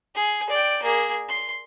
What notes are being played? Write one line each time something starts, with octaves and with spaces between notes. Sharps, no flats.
G#4
D5 G5
A#3 G#4
C6